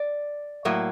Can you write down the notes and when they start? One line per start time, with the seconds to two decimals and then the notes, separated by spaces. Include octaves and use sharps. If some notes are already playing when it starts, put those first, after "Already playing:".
Already playing: D5
0.65 A2 F#3 A#3